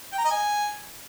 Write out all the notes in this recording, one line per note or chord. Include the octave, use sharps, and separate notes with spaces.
G5
A#5
D#5
G#5